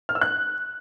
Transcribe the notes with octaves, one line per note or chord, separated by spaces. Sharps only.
F6
E6
F#6